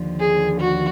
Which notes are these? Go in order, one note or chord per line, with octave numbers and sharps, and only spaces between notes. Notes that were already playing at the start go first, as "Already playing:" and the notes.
Already playing: D#2 D3 F3
G#4
F#4